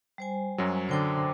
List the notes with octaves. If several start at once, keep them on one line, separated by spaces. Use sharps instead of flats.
G3 C5 G#5
F#2 F#3
D3 C5 G5 D6